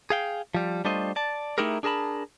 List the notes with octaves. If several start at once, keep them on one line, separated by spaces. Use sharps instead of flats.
G#4 F5 G5
F3 G3
G3 A3 D4 F4 C5 D#5
D5 A5
A3 D#4 E4 G4 G#4 A#4
D4 G#4 A#4 A5 B5